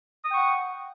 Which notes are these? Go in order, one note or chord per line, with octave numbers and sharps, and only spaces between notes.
F#5 G5 C#6 D#6